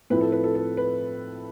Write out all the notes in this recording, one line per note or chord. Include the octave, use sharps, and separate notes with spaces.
A2 F3 C4 E4 B4
A4
B4
A4
A4
B4